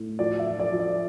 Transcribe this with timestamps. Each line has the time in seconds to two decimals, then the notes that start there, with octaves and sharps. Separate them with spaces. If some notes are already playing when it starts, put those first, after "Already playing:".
Already playing: A2
0.19 F3 D5
0.39 E5
0.46 F3
0.59 D5
0.73 F3
0.80 D5